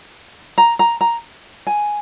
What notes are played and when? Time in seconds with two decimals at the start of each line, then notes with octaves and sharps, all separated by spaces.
0.58 A#5
0.79 A#5
1.01 A#5
1.67 G#5